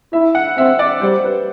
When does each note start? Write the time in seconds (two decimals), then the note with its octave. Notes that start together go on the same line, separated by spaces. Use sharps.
0.13 E4 E5
0.35 F#5
0.57 C4 E5
0.79 D5
1.01 G3 C5
1.24 B4